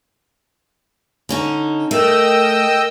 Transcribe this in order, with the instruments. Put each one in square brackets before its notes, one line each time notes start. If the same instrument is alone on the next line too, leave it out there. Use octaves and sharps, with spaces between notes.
[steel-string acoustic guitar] D3 C#4 D#4
[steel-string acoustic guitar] A3 [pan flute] A#4 [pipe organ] D#5 G5 E6